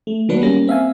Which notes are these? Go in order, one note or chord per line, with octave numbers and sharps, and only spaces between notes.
A3
D#3 F#3 A#3 B3 D4 B4
G3 A#3 C#4 A#6
C4 E5 F5 G#5